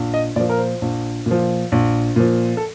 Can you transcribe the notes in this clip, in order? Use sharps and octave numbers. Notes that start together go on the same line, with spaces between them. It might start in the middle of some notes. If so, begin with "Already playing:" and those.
Already playing: A#1
D#5
A#2 F3 D5
A#4
C5
A#1
A#2
F3
A#1
A#2 F3
A4